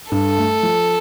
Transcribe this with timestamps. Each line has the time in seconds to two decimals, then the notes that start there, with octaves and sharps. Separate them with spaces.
0.12 G2 A4
0.38 A3
0.63 F3